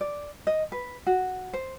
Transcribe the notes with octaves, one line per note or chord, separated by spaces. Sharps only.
D5
D#5
B4
F#4
C5